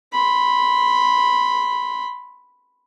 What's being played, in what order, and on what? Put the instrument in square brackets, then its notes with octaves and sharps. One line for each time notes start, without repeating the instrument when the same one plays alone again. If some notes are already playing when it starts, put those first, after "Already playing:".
[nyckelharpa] B5 C6